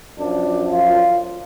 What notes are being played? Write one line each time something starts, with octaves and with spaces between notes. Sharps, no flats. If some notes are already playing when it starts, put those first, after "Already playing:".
F#2 F3 D4
F4